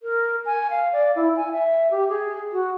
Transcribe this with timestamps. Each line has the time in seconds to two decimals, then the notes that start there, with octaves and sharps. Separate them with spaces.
0.03 A#4
0.46 G#5
0.70 F5
0.93 D5
1.16 E4
1.36 G#5
1.52 E5
1.91 G4
2.09 G#4
2.52 F#4